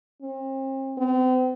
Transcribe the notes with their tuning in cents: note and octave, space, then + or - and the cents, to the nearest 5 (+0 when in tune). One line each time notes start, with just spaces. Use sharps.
C4 +40
C4 -40